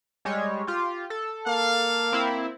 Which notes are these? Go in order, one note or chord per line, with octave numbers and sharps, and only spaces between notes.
G3 G#3 C#5
F4 G4
A4
A#3 F5
C4 E4